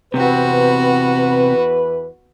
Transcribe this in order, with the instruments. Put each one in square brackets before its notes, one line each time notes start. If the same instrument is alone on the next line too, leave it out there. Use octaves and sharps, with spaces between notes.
[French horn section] E2 E3 B4 [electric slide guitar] C3 C4 [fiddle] B3 F#4